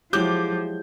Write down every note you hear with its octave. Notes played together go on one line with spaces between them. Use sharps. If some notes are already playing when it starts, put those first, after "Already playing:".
F3 F#3 G#3 E4 G4 D6 G6